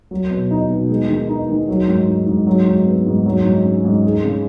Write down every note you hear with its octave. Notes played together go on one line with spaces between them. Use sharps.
F#3
B2
D#4
B2
G#3
D#3
D#4
D#3
F#3
G#2
D#4
G#2
F#3
G#2
B3
G#2
F#3
G#2
C#4
G#2
G#3
C#3